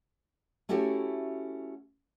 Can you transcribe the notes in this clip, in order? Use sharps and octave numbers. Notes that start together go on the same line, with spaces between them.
A3 C#4 E4 F#4 G4 A4